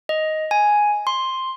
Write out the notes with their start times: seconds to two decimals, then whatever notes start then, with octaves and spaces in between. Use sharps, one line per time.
0.09 D#5
0.51 G#5
1.07 C6